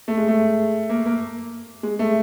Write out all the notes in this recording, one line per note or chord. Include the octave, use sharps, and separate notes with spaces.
A3
G#3
A3
A#3
A#3
G#3
A3